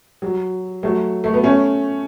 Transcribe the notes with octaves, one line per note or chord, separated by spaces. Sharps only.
F#3
F#3 A3
A3
B3
A3 C#4